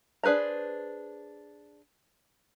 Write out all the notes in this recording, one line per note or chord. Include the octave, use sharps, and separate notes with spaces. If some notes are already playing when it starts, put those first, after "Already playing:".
D4 G#4 B4 C5 A#5